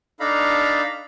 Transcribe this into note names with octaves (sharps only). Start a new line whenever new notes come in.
D4 D#4 A4 F5 A#5 B5